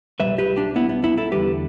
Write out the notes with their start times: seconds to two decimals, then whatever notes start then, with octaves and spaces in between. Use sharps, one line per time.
0.20 B1 B2 G3 B4 E5
0.38 G4 B4
0.57 D4 G4
0.76 B3 E4
0.89 B3
1.04 B3 E4
1.17 E4 A4
1.32 E2 D3 G3 G4 B4